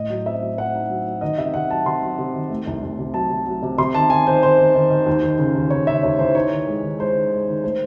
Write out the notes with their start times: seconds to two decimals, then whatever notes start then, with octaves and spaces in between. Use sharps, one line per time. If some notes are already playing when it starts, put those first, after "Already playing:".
Already playing: A2 D#5
0.10 F#3
0.26 C4 E5
0.41 F#3
0.58 C4 F#5
0.74 D#4
0.90 F#3
1.06 F#3
1.21 D#3 D#5
1.38 C3 E5
1.54 C3 F#5
1.70 F#3 A5
1.85 C3 C6
2.02 F#3
2.18 C3
2.34 D#3
2.50 A3
2.67 C2
2.83 C2
2.99 C3
3.14 F#3 A5
3.30 C3
3.47 F#3
3.62 C3
3.78 C3 C6
3.94 D#3 A5
4.10 D#3 G#5
4.27 D#3 C5
4.43 D#3 C5
4.59 D#3
4.75 D#3
4.90 D#3
5.06 D#2
5.22 D#2
5.39 C#3
5.55 D#2
5.70 C#3 C#5
5.87 C#3 E5
6.03 D#2 C#5
6.19 E3 C5
6.35 D#4 C#5
6.51 D#3
6.67 G#3
6.83 D#3
6.99 G#3 C5
7.16 D#3
7.32 G#3
7.48 D#3
7.64 A3 C5